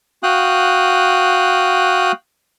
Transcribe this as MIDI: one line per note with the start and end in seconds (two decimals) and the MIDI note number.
0.23 2.12 66
0.23 2.12 77
0.23 2.12 79
0.23 2.12 87
0.23 2.12 90